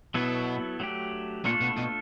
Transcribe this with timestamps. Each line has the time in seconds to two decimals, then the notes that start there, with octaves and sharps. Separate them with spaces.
0.14 B2 F#3 B3 E4 A4
0.80 F#3 A3 D4 G4
1.45 A#2 A3 D4 F4 A4
1.61 B2
1.77 B2